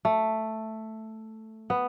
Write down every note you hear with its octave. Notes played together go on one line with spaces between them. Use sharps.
A3
B3